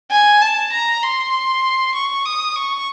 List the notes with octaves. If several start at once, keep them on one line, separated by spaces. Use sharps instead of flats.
G#5
A5
A#5
C6
C#6
D#6
C#6